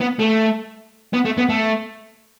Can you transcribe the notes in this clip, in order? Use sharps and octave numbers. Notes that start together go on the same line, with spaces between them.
B3
A3
B3
A3
B3
A3